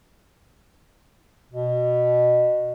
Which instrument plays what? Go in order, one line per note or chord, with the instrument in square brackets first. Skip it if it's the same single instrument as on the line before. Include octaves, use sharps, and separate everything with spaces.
[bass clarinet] B2